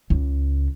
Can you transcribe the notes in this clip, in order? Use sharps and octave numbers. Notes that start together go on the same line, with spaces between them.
C#2